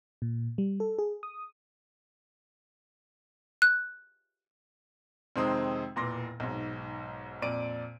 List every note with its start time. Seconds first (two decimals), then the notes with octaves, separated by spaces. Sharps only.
0.22 A#2
0.58 G3
0.80 A4
0.98 G#4
1.23 D#6
3.62 F#6
5.36 F2 C3 D#3 G#3 C4 D#6
5.96 E1 A#2 E3 C6 D6 A#6
6.40 B1 G#2
7.42 F2 A#2 D5 D7 D#7